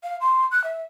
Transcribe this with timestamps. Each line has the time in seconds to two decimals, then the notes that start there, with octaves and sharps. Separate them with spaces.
0.04 F5
0.21 C6
0.52 F#6
0.64 E5